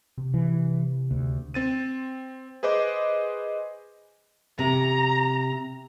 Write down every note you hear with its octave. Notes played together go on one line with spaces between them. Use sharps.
C3
E3
D2
C4 A6 D#7
G#4 B4 C5 D#5 D6
C3 A#5